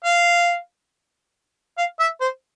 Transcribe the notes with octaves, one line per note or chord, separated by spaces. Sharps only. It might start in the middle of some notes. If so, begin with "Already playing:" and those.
F5
F5
E5
C5